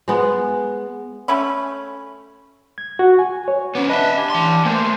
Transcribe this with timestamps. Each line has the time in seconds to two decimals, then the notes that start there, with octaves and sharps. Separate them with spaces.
0.08 G#3 B3
1.28 A3 C#4 B5
2.78 G#6
2.99 F#4
3.19 G#5
3.48 C#5
3.75 B3 C#4 D6
3.89 D4 B4 D#5 E5 B5
4.18 D4 G4 G#5
4.30 E3 C6
4.65 A3 A#3 C5